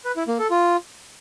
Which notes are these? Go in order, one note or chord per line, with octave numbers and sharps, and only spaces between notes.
B4
E4
A#3
A4
F4